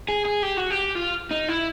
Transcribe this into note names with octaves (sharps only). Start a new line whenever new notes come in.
G#4
G#4
G4
F#4
G4
F4
D#4
E4